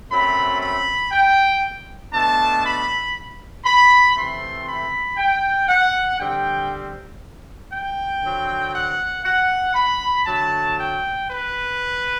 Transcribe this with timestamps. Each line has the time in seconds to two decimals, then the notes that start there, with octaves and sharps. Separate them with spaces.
0.10 F#2 F#3 A3 C4 B5
0.60 B5
1.11 G5
2.13 B2 A3 D4 A5
2.65 B5
3.65 B5
4.16 C3 E3 A3 C4 C6
4.68 B5
5.17 G5
5.69 F#5
6.20 D3 G3 C4 G5
7.71 G5
8.22 D3 F#3 C4
8.74 F#5
9.25 F#5
9.75 B5
10.25 D3 F#3 A3 A5
10.77 G5
11.28 B4